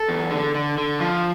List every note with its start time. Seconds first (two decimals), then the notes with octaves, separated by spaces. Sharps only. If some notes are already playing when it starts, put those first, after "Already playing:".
Already playing: A4
0.09 E2
0.31 D3
0.55 D3
0.78 D3
1.00 F3